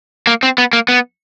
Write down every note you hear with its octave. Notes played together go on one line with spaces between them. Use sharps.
A#3
C4
B3
A#3
B3